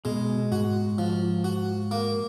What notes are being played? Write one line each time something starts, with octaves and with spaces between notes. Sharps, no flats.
B2 G#3
G#2 F#4
F3
F#4
A#3